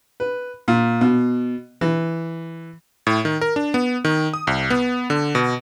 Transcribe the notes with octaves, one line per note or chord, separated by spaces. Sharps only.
B4
A#2
B2
E3
A2
D#3
A#4
D4
B3
D#3
D#6
C2
B3
D3
B2